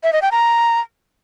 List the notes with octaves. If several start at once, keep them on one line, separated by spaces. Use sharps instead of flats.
E5
D#5
G5
A#5